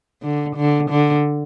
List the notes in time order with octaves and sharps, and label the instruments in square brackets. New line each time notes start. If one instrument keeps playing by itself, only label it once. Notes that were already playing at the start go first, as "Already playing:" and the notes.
[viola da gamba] D3
D3
D3